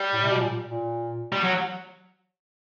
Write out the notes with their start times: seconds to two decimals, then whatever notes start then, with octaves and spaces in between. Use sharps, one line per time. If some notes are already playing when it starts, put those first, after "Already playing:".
Already playing: G3
0.13 A2
0.22 C3
0.30 B2
0.40 A#2
0.66 A#2
1.32 G3
1.44 F#3